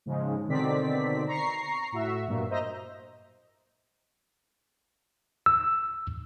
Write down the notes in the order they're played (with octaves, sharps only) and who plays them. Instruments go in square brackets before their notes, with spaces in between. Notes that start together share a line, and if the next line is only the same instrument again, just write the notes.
[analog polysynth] G#2 C#3 F3 G#3
B2 D3 D#3 C4 D5 B6
A#5 C#6 C7
A2 F#4 E5
G2 A#2 F#3
C5 D#5 E5 A#5 D#6
[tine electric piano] E6